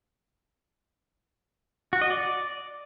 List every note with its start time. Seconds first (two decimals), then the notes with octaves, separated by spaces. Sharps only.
1.93 F#4
2.02 D#5
2.10 D5